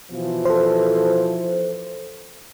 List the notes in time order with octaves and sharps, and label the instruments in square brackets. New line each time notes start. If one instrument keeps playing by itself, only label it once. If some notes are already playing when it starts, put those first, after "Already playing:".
[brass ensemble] B2 E3 F3
[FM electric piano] A4 C5